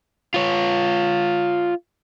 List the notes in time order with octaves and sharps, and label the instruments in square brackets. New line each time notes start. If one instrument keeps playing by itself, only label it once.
[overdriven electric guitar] F4 C#5